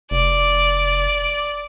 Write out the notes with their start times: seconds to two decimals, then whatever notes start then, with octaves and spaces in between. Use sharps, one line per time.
0.11 F1 D5